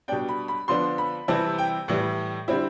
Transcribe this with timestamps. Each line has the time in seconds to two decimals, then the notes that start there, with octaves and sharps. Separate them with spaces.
0.08 B2 G3 D4 G5
0.28 B5
0.48 B5
0.68 D3 F3 B3 D4 C6
0.98 B5
1.28 C3 E3 G3 C4 E4 A5
1.58 G5
1.88 A2 E3 G3
2.48 D3 G3 C4 E4